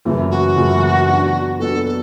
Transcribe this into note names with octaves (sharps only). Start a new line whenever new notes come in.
F#2 C#3 E3 A3
F#4
F#2 C#3 E3 A3
F#3 B3 D4
F#3 B3 D4 A4
A4